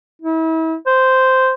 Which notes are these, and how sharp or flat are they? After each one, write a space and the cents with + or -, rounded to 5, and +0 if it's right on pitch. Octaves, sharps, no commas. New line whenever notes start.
E4 -35
C5 -5